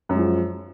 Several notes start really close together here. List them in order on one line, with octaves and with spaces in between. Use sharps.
F#2 G#3 F3